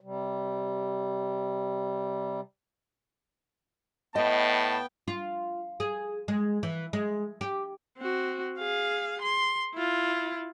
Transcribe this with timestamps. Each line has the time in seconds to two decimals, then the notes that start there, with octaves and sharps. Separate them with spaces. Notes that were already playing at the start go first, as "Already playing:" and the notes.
0.01 C3 G3
4.15 A2 B3 D#5 G5 A5
5.08 F4
5.80 G#4
6.28 G#3
6.63 E3
6.93 G#3
7.41 G4
7.98 C4 F#4
8.59 G#4 F5
9.21 C6
9.75 E4 F4